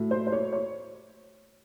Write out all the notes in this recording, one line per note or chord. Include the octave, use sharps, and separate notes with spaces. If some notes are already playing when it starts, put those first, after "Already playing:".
Already playing: A2 F#3 A3
C5
C5
C#5
C#5